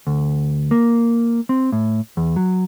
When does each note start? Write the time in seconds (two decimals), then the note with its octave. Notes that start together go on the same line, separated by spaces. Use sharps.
0.07 D2
0.71 A#3
1.49 C4
1.72 A2
2.17 E2
2.36 F#3